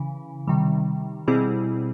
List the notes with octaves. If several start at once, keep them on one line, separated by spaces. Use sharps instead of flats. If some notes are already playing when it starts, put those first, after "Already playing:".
Already playing: C#3 E3
C3 D#3 G3
B2 G3 C4 E4 G#4